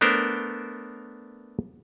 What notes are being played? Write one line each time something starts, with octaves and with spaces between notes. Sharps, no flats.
A3 B3 D4 A#4 C5